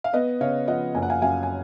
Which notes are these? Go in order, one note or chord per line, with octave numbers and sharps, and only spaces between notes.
F5
B3 B4 D#5
C#3 C#5 F5
F3 D#5 F#5
F#1 G#5
F#5
F5 G#5
F#2 F5 G#5
G#5